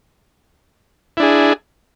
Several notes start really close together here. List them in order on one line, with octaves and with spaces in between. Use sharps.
E4 D4 G#4